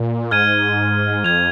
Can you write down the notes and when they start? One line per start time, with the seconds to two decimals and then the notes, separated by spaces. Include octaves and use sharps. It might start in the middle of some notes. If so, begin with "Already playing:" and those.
Already playing: A#2
0.31 G#2 F6 G#6 D#7
1.24 F2 G#6 F7